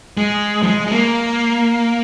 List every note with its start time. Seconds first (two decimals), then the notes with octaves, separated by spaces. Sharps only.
0.17 G#3
0.63 F3
0.67 G#3
0.87 G#3
0.91 A#3